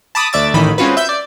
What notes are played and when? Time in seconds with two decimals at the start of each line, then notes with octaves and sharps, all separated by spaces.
0.15 A5 B5 D6 D#6
0.33 D2 D5 E5 D6 A6
0.54 A1 A2 D#3 E3 B5
0.78 G#3 C4 C#4 F4 F#4 B4
0.97 E5 G6
1.09 D5